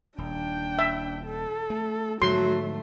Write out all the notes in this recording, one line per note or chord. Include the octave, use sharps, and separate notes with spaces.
D#1 D4 G5
E5
A4
A3
G#2 D3 F3 F#3 A3 C6